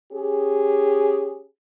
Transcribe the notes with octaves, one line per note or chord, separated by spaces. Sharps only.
C#4 G4 G#4